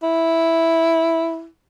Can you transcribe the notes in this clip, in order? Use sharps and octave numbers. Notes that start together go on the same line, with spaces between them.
E4